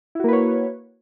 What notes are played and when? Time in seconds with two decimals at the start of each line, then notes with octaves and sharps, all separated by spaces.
0.15 E4
0.20 F#4
0.24 A#3
0.28 B4
0.33 C#5